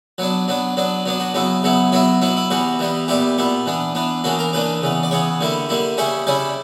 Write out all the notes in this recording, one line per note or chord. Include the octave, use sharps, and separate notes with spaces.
F#3 B3 D4
F#3 B3 D4
F#3 B3 D4
F#3 B3 D4
F#4
C#3 F#3 B3 E4
C#3 F#3 B3 E4
F#3 B3 E4 F#4
F#3 B3 E4
E4
E3 G3 B3 F#4
E3 G3 B3
A#2 G3 B3 E4 G4
A#2 G3 B3 E4
E3 B3 D4
E3 B3 D4
C#3 E3 A#3 D4 F#4
A#4
C#3 E3 A#3 D4 B4
C#3 E3 B3
D5
C#3 E3 B3 C#5
D3 G3 A#3 E4
D3 G3 A#3 E4
C#3 G3 C#4 E4 C#5
C#3 G3 C#4 E4 D5